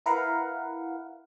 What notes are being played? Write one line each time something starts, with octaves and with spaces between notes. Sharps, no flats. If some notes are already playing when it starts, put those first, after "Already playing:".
E4 A#4 B4 F5 F#5